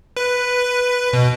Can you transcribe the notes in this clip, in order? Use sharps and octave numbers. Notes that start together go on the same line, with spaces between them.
B4
B2